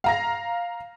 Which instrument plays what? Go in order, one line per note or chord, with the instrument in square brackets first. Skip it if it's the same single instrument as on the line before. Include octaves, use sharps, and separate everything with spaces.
[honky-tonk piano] F5 A#5 A#6